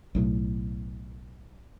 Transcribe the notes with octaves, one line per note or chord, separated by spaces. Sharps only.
B1 A2